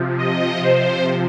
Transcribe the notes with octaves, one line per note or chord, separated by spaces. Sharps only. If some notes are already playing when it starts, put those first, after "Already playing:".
Already playing: C3 F3
D#5
C5